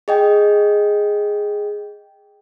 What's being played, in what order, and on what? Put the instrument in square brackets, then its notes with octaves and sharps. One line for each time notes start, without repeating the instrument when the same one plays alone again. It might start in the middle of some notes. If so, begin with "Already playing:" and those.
[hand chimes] G#4 D#5 G5